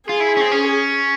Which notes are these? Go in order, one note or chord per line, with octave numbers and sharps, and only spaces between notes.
F4 G#4
E4
C#4
C4
C#4